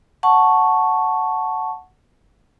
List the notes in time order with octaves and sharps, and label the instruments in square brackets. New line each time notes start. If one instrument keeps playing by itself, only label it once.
[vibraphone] F#5 A5 C#6